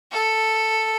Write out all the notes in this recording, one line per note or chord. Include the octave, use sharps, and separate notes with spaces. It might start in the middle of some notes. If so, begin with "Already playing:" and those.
A4